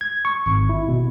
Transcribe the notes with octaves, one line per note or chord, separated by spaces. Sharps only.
G#6
C#6
G#1
E4
B2